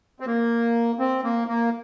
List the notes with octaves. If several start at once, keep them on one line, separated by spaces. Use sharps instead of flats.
C4
A#3
C4
A#3
A#3